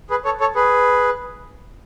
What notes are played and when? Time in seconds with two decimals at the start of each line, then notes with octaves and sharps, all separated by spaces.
0.10 G#4 B4
0.25 A4 C#5
0.40 A4 C#5
0.55 G#4 B4